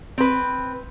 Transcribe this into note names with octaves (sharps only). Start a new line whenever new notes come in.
C4 B4